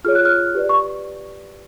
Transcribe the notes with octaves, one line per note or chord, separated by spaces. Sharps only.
F4 G#4 C#5 F6
F#6
F6
G4 B4 D5
C#6